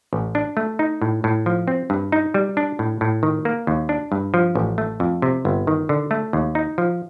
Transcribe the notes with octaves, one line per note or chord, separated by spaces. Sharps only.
A1
D4
A3
D#4
A2
A2
F3
C4
G2
D#4
G3
D4
A2
A2
D#3
A#3
D#2
D4
G2
F3
A1
A3
F2
C3
G1
D#3
D3
A3
D#2
D#4
F3